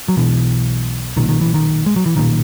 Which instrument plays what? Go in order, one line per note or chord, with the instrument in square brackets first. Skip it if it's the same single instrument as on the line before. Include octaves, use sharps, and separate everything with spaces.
[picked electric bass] F#3
B1 B2 E3
B1 A#2 D#3
D#3
E3
D#3
G#3
F#3
E3
B1 A#2 D#3